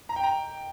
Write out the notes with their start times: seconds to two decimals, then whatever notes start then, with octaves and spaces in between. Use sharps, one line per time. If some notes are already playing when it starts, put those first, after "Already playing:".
0.09 A#5
0.16 G5
0.23 A#5